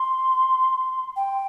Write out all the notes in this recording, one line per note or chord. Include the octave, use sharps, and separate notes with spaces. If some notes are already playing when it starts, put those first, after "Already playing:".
Already playing: C6
G5